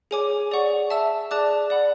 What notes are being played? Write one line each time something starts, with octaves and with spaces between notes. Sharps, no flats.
G#4 C#5 G#5 D6
G#4 D5 F#5 C#6
E5 A5 E6
G#4 D5 A5 D6 F#6
D5 F#5 B5